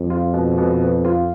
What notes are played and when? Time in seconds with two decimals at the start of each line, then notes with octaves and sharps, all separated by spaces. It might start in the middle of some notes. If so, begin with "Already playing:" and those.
Already playing: F2
0.10 F4
0.33 B2
0.58 B2
0.81 B3
1.05 F4